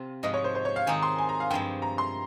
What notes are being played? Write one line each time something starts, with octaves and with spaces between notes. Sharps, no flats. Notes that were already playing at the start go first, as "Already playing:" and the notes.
Already playing: C3 C4 F4
G#2 F3 G#3 D#5
C#5
C5
C5
C#5
F5
D#3 G#3 C4 D#4 G#5
C6
G#5
A#5
F5
G2 F3 G#3 C4 G5
A#5
C6